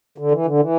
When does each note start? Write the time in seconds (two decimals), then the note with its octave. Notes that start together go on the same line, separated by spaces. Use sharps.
0.18 D3
0.31 E3
0.46 D3
0.60 E3